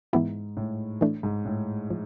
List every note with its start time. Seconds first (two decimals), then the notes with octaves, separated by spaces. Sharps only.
0.13 G#2 E3 B3 E4
0.57 A2
1.01 E3 A3 D4
1.23 G#2
1.45 A2
1.90 F3